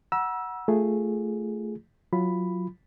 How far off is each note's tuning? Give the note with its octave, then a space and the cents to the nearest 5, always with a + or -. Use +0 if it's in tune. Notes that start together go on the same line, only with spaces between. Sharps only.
F#5 +0 A#5 +45 E6 +0
A3 +0 F4 -10 G#4 +0
F#3 -20 F4 -25 B5 +5